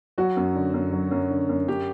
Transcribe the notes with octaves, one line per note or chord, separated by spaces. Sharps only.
F#3 F#4
F#2
D3
F#2
F#3
F#2
D3
F#2
F#2 G4